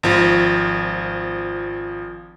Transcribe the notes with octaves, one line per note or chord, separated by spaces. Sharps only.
G#1 F3